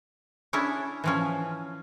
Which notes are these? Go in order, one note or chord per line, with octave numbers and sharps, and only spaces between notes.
C#4 D4 E4 G#4 C#5
E3 F3 C#4